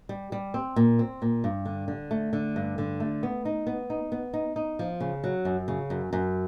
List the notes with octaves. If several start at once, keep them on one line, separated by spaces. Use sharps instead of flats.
G3
G3
C4
A#2
C4
A#2
G2
D3
D3
A3
D3
G2
D3
A3
B3
D#4
B3
D#4
B3
D#4
D#4
F3
C#3
F#3
F#2
C#3
F#2
F#2